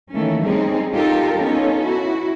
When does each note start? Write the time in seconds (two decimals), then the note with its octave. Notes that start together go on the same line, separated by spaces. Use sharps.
0.12 D#3 E3 A3 A#3 C#4
0.46 G3 C4 C#4 D#4 G#4
0.94 D#4 F4 G4 A4 A#4
1.38 B3 C#4 D#4 F4 A4
1.84 E4 F#4